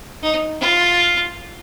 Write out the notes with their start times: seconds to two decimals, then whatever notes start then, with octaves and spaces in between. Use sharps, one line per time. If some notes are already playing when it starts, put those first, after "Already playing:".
0.23 D#4
0.60 F4